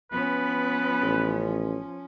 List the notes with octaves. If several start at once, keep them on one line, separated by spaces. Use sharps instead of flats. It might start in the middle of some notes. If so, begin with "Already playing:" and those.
F3 B3 C#4 B4
A1